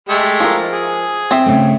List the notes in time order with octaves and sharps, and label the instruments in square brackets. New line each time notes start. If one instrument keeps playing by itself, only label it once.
[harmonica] G#3 A3 G4
[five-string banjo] F3 A#4
[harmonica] G#4
[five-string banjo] C4 E5
[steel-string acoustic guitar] C#3 A3